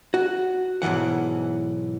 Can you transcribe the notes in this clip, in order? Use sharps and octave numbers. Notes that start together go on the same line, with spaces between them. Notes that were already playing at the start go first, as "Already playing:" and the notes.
F#4
B1 G#2 C3 E3 F#5